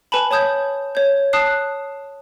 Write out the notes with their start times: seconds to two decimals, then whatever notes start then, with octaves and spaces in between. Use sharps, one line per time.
0.12 B4 G#5 A5 B5
0.31 C#5 A5 D#6 G6 G#6
0.95 C#5 G6
1.33 A5 D#6 F#6 C7